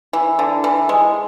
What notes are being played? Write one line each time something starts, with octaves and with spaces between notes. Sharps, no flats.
E3
D3
E3
G#3